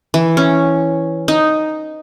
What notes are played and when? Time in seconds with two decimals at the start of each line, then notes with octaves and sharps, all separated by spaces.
0.14 E3
0.37 C#4
1.28 D#4